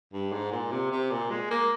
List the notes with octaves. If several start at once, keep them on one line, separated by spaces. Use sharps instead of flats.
G2
G#2
A#2
C3
C3
A#2
G#3
A#3